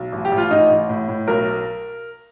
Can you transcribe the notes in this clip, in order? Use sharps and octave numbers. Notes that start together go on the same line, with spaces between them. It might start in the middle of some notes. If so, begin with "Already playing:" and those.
Already playing: B1
A1
G4
A1
F4
A1 D#4
A1
A2
A2
B1 A#4